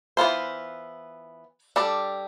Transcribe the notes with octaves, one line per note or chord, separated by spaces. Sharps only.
E3 B3 F4 C5
G3 D4 A4 D5